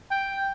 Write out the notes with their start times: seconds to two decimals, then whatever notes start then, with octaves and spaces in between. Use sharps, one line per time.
0.11 G5